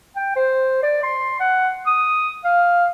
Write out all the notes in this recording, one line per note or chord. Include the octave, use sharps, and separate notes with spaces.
G5
C5
D5
C6
F#5
D#6
F5